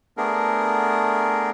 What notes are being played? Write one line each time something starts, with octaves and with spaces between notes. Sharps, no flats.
A3 B3 D4 G#4 A#4